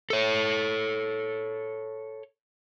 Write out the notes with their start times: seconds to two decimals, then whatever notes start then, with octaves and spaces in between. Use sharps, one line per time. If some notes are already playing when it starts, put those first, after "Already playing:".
0.10 A4 C#5